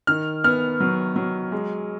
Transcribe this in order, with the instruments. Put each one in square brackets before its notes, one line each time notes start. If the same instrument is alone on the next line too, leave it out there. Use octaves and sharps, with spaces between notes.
[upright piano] D#3 [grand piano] F6
[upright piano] B3 [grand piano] F6
[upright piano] F#3
F#3
G#3